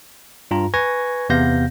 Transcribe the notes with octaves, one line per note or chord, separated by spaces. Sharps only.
G2 F4 A#5
B4 G#5 C#6 G#6 A#6
E2 C3 B3 F5 G6 A#6